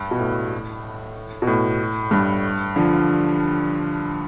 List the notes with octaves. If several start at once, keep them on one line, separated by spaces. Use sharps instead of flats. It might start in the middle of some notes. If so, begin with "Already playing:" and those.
Already playing: G2
B2
A2
B2
A2
G2
D3 F3